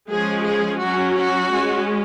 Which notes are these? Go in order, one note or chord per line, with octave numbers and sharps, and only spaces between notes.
F3 G#3 C#4 G#4
G#4
F#3 C#4 F#4
F#4
G#3 C#4